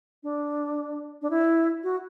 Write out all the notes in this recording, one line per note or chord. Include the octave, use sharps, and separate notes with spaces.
D4
D4
E4
F#4